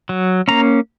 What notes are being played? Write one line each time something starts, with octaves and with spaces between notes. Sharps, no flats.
F#3
A#3 C#4 A#5